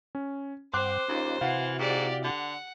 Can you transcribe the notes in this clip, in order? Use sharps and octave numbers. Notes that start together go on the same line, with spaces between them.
C#4
G2 C4 C5 F#5 C6 D6 F#6
D#2 C#4 D#4 F4
C3 E3 E4 F#4 F5 F#5 C7
G#2 G4 D5
D3 F#5